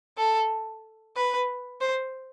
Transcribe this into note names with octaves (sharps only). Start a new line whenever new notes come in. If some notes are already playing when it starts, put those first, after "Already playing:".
A4
B4
C5